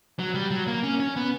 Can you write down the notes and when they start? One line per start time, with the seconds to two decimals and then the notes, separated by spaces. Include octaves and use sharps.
0.19 F#3
0.35 G3
0.51 F#3
0.67 A#3
0.83 C#4
1.00 C#4
1.16 B3